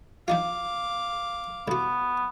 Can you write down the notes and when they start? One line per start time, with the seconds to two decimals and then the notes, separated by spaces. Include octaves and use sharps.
0.28 F3 D#4 F4 F5 D6
1.68 C2 B3 F#4